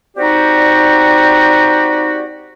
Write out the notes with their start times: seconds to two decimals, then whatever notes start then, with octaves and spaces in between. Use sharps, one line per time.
0.17 C4 D#4 F#4 G4 D5